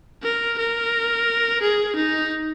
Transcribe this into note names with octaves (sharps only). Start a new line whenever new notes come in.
A#4
A#4
G#4
D#4